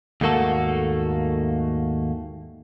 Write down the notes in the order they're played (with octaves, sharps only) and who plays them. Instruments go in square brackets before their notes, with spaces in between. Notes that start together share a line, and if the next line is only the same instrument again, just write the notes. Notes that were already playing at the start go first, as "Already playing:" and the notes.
[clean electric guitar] D#2 G#2 A3 A#3 F#4 A4